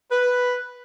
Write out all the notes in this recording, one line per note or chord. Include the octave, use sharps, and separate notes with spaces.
B4